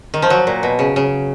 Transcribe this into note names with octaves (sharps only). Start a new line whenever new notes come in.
D#3
F3
F#3
A#2
B2
C#3
C#3